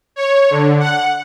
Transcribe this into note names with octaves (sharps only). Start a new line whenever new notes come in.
C#5
D3
F#5